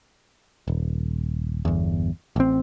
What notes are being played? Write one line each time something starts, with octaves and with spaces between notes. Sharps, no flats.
D#1
G1 E2
A1 C4